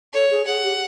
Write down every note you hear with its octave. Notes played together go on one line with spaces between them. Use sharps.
A4 C#5
G#4
G#4 F#5
G4